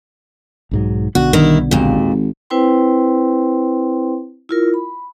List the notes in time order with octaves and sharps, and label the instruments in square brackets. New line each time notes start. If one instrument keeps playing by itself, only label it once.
[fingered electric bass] B1 G#2 F#3
[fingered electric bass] B1 D3 B3 [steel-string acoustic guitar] F#4
[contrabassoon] G2 [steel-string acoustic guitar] D#3 E4
[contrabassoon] G#1 [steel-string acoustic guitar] D#2 A#2
[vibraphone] C4 E4 B4 C5 G5 C6
E4 F4 A#4
B5